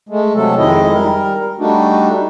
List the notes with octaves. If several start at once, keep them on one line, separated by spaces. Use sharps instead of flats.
G#3 A3
C3 F#3 A3 A4
F2 D#3 G#3 E4 D#5
G3 A#4
G3 A3 D4 D#4 F#4